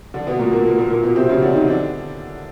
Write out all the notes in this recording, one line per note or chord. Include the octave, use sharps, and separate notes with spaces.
D3 D4
B2 B3
A#2 A#3
A#2 A#3
A#2 A#3
A#2 A#3
A#2 A#3
B2 B3
C3 C4
C#3 C#4
D3 D4
D#3 D#4
D3 D4